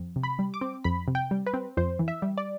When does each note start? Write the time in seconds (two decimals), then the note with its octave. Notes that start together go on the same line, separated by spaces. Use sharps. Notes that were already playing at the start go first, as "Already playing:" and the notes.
Already playing: F2
0.16 C3
0.23 B5
0.39 G3
0.54 D6
0.61 C4
0.84 F2 B5
1.08 C3
1.15 G5
1.31 G3
1.47 B4
1.54 C4
1.77 F2 C5
1.99 E3
2.08 E5
2.22 G3
2.38 D5